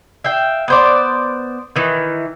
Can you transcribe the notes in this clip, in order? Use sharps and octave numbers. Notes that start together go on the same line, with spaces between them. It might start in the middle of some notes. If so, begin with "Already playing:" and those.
E5 F5 G5
B3 C5 D5
D#3 E3